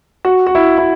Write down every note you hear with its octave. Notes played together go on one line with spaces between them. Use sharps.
F#4
F#4
E4
E4